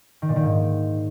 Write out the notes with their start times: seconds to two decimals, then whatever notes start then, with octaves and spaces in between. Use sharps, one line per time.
0.22 D#3
0.29 A#2
0.36 D#3
0.43 G#2